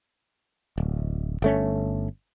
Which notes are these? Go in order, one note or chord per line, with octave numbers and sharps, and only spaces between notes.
D1
G1 A3 C#4